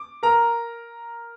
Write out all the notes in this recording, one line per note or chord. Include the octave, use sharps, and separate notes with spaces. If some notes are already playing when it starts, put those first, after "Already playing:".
Already playing: D6
A#4 A#5